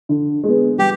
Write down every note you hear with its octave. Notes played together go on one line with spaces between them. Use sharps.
D3
G#3 B3
G3 G4